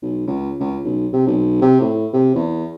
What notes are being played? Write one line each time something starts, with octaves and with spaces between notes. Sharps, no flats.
B1
C#2
C#2
B1
C3
B1
C3
A2
C3
E2